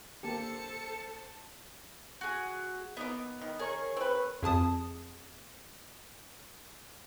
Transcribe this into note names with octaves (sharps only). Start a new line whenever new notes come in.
A#3 D4 G4 A4 C5 A5 C#7
F#4 G#4
A#3 B3 D#4
D#3
G#4 A#4 C#5 C#6
C4 B4
F2 G#4 A5 D#6